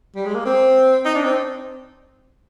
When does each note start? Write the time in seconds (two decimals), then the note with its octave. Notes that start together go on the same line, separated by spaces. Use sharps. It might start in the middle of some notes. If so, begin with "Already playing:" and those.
0.16 G3
0.26 G#3
0.35 A#3
0.46 C4
1.05 D#4
1.15 D4
1.25 C4